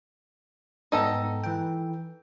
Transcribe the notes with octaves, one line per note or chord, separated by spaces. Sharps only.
G#2 B3 D#4 A4 G5 A#5
E3 G5